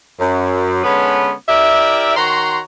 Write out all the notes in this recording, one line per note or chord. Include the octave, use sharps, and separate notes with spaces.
F#2
D3 G#3 B3 C#4 B4
E4 G4 A#4 D5 E5
D#3 F#4 C#5 A#5 C6